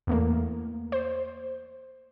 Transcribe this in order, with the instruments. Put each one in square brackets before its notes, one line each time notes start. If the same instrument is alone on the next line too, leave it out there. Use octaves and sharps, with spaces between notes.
[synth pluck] E2 A3 A#3
C5